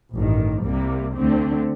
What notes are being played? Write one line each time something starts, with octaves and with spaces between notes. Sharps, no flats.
A1 G2 D#3
C2 C3 G3 A#3
D2 D3 A3 C4